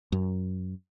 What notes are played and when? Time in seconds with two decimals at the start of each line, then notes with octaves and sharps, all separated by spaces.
0.12 F#2